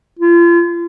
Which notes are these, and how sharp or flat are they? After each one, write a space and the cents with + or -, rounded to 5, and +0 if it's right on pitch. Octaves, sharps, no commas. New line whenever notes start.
F4 -35